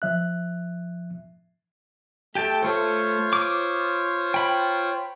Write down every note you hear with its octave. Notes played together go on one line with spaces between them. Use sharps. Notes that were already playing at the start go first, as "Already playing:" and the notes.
F3 E5 F#6
A3 G4 G5 A5
A3 F4 A4 C5 C#5
D6 D#6
G5 B5